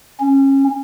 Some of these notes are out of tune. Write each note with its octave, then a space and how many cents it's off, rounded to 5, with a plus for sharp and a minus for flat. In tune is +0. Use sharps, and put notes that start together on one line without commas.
C#4 -25